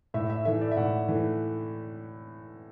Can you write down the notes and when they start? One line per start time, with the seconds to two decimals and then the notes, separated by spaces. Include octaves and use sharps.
0.14 A2 E5
0.30 E5
0.45 E3 A3 E5
0.61 D5
0.71 E5
0.77 A2 F#5
1.08 E3 A3